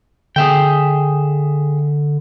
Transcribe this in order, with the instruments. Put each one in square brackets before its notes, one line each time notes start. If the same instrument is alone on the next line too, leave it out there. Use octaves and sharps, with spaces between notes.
[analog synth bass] D3 [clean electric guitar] G#4 E5 G5